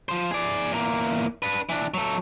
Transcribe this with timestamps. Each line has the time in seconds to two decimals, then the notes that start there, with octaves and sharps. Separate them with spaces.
0.09 F3 C5
0.31 G#4 D5
0.72 E2 A#3
1.42 D4 B4
1.69 E3 D4
1.94 F#3 A4